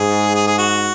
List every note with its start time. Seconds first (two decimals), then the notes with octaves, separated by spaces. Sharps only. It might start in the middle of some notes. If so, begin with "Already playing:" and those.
Already playing: G#2 G#4
0.35 G#4
0.47 G#4
0.58 F#4